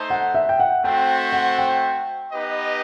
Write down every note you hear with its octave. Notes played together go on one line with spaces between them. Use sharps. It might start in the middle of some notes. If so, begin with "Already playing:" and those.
Already playing: A3 D#4 A4 C5
F#5
E5
G5
F#5
A3 C4 F#4 C5 E5 G5
F#5
G5
B3 D#4 G4 B4 D#5